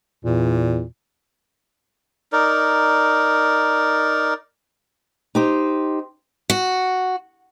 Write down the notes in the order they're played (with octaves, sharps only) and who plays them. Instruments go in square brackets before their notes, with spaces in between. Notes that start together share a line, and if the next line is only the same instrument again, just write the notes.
[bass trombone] E2 [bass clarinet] A#2
[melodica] D#4 A#4 D5
[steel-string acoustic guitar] D#4 G4 C5
F#4